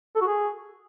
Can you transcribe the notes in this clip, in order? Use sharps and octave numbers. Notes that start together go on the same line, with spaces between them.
A4
F#4
G#4